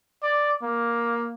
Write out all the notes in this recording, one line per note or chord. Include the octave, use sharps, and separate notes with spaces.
D5
A#3